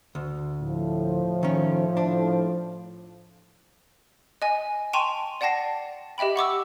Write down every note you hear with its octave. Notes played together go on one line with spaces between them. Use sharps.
D2
A2 F3
D#3 C#4
D4
D#5 G#5
G5 A5 C6 C#6 D#7 F7
D5 F#5 G5 A5 A#6 C7
G4 D#5 E5 G5 B5
F#5 C#6 D6 E6